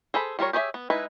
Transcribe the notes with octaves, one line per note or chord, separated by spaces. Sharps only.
G#4 A4 C5 B5
G3 F4 A#4 C#5
G4 G#4 C#5 D#5 E5
B3
G#3 D#4 E4 B4